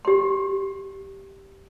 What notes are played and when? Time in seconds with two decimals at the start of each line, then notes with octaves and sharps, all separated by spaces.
0.05 G4 C6